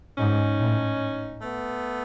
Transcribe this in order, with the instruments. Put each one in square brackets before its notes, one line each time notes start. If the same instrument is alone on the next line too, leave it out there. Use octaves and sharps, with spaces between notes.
[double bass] G#2 [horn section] C#4 D#4
[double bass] A2
[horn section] A3 B3